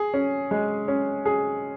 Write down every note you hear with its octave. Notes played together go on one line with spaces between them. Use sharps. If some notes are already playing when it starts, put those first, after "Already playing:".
Already playing: G#4
C#4
G#3
C#4
G#4